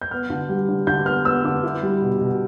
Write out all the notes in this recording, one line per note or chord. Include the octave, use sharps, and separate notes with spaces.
G6
B3 F6
D3
G3
D3
D3 G6
B3 F6
B3 E6
D3 D6
E4
G3
B2
B2